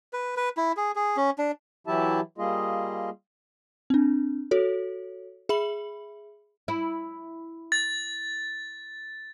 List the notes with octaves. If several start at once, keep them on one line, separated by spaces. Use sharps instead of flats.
B4
B4
E4
G#4
G#4
C#4
D4
E3 F#3 E4 G4 E5 A5
G3 A#3 F4 G#4 D#5
C4 D4
F#4 A4 C#5
G#4 E5 B5 F#7
E4
A6